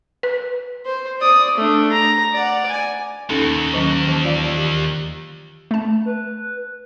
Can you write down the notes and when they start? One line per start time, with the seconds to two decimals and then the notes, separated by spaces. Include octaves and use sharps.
0.23 B4
0.85 C5
1.20 D5 D#6
1.58 A3 D4
1.92 A#5
2.33 D5 F#5
2.69 G#5
3.29 D#2 C#4 D#4 A4
3.74 D#3 F#3 C#4
4.08 E3 A5
4.24 F4 D5 F5
4.57 G4
5.71 A3 A5
6.05 B4